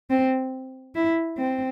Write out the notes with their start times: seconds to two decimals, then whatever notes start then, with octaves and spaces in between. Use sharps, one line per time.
0.10 C4
0.95 E4
1.38 C4